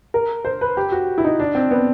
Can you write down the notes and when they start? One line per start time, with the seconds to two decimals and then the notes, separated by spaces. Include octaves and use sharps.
0.14 A#4
0.45 C5
0.61 B4
0.77 G4
0.92 F#4
1.18 E4
1.24 D#4
1.40 D4
1.55 C4
1.71 B3